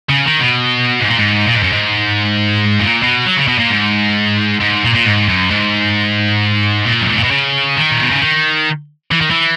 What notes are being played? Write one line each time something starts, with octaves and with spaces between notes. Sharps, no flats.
C#3
D#3
B2
G#2
A#2
G#2
A#2
G#2
F#2
G#2
A#2
B2
F#3
C#3
B2
A#2
G#2
G#2
A#2
A#2
G#2
F#2
G#2
A#2
F#2
G#2
A#2
B2
C#3
D#3
A#2
B2
C#3
D#3
E3
D#3
E3